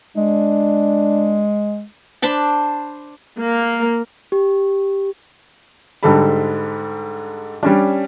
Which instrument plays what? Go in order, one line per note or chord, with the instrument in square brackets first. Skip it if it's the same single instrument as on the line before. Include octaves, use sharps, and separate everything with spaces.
[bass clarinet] G#3 [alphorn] D4
[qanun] D4 C5 A5 B5
[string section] A#3
[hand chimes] G4
[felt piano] G#2 D3 G3 A4 A5 B5
G3 C#4 D4